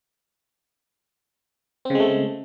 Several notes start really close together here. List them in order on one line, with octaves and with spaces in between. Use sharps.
C4 C#3 G#3 A3